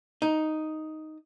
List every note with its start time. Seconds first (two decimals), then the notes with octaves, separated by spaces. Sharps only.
0.22 D#4